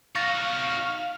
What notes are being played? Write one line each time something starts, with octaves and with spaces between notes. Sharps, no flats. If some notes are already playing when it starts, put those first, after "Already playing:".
D#4 F#4 F5 C#6 A6 A#6